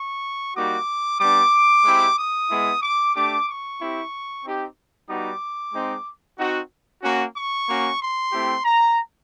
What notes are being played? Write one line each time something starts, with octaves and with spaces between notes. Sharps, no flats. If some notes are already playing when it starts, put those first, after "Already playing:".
Already playing: C#6
G3 A#3 D#4 F#4 D6
G3 B3 D4 D6
G#3 C4 E4 G4
D#6
G#3 B3 E4
D6
A3 D4 G4 D6
C#6
C4 E4 G4
C4 D#4 G4
G3 B3 D#4 F#4 D6
G#3 C4 D#4
C4 D#4 F#4
A#3 C#4 F#4
C#6
A#3 C#4 F#4
C6
A3 C4 E4 G4
A#5